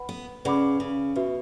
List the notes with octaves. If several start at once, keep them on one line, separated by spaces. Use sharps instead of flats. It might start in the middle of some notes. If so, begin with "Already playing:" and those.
Already playing: B4 F#5 B5
B3
C#3 B4 D5 F#5 B5 D6
C#3
B2 F#4 B4 E5